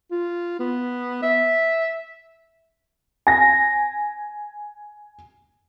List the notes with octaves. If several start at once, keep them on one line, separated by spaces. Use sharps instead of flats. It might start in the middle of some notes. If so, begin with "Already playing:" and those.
F4
B3
E5
G#5 A#6